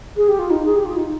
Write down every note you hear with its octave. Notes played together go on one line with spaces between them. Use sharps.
G#4
G4
F4
D#4
G#4
G4
F4
D#4